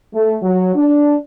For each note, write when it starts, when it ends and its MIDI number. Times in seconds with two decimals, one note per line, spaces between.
0.14 0.37 57
0.43 0.74 54
0.76 1.16 62